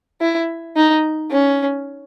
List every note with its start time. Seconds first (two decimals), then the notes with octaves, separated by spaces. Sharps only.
0.21 E4
0.76 D#4
1.31 C#4